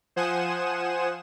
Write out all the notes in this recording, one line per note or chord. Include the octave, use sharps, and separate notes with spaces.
F3 C5 F#5 G#5 D#6 E7